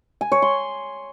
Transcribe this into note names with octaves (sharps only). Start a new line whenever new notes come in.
G#5
C#5
C6